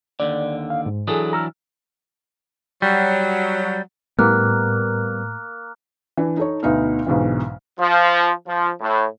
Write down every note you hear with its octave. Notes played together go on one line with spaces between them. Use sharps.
D#2 D3 D5
F5
G#2
E3 F#3 D4 G#4 A4 D#6
A#5 E6 F6
F#3 G3
A2 G3 A#3 B3 F6 F#6
E3 D4
D#4 A4 C#5
D2 B2 B3 D#4 F5 F6
B1 G#2 B2 D3 E3
F3
F3
A2